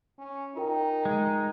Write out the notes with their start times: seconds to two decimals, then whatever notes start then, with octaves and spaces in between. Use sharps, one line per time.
0.18 C#4
0.56 D#4 F4 A#4 G5
1.05 G#3